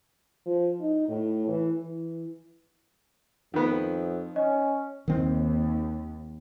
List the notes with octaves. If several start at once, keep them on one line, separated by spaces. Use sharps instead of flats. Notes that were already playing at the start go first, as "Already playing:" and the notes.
F3
D#4
A2
E3
E3
F2 D#3 B3
C#4 D#5
D#2 D#3 C4